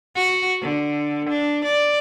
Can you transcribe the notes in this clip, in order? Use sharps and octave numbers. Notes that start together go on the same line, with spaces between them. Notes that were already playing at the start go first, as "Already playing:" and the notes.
F#4
D3
D4
D5